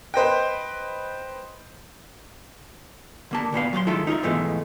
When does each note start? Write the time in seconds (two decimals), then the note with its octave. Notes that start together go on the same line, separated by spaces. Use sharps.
0.14 B4 C5 D#5 G5
3.31 D3 A#3 A5
3.52 D2 A#2 B3 F5
3.73 F#3 F5 F#5 C6
3.87 D#3 G#3 A3 E4 F4 A4
4.07 D#4 F4 D#5 E5
4.23 G#2 B2 E3 F3 G#3 A3